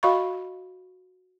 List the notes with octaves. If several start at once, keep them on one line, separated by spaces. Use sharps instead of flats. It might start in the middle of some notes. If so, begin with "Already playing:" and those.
F#4 D#5 F5 B5 C#6